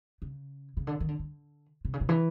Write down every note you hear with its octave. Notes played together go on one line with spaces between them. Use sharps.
C#3
C#3
D3
D#3
D3
D3
C3
C#3
B2
E3